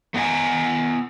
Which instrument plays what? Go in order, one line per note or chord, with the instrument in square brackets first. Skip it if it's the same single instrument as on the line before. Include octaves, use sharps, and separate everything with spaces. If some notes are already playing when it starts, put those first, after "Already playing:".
[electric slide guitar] A3 B3 D4 D#5 F#5 G#5